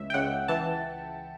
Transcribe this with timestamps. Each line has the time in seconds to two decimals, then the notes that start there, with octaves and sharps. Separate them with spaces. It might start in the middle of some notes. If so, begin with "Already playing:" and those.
Already playing: C#2 E5
0.10 G5
0.14 C#2 F#5
0.48 E3 A5